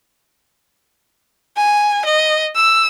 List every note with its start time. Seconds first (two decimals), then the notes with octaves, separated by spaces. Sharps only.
1.57 G#5
2.05 D#5
2.56 E6